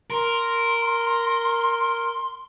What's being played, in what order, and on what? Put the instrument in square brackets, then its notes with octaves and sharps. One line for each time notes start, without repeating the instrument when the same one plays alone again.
[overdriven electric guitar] A#4 [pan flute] C6